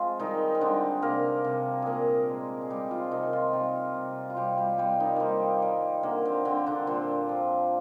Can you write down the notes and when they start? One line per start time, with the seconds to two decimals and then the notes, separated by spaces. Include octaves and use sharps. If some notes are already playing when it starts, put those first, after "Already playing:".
Already playing: F3 G#3 C4 F4
0.19 D#3 G3 D#4
0.55 C4
0.61 D3 G3 D4
1.02 C3 A#3 A#4
1.44 C3
1.82 A#2 A#3 G#4 A#4
2.29 G#3
2.61 G#4
2.70 G3 G#3 G4
2.91 F3 F4
3.11 C3 D#3 D#4
3.33 F3 F4
3.53 C3 G3 G4
3.95 C3
4.30 F4
4.37 C3 G3 G4
4.57 G3 G4
4.78 C3 G3 G4
5.00 D#3 D#4
5.16 G3 A#3 C4
5.62 G3
6.03 D3 A#3
6.25 C4
6.45 D3 C4
6.66 D3 D4
6.87 A#2 C4
7.29 F3